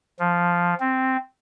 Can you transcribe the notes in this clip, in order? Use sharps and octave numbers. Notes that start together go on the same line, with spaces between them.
F3
C4